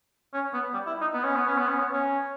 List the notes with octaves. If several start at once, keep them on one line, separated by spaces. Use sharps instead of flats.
C#4
B3
G3
E4
D#4
B3
C#4
B3
C#4
B3
C#4
B3
C#4